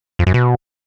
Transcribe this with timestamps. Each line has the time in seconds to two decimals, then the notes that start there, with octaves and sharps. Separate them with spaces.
0.19 F2
0.27 F#2
0.34 B2